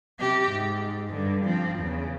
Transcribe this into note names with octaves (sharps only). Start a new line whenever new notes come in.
C3 G4
G#2
G2 D3
F3 C4
E2 C#3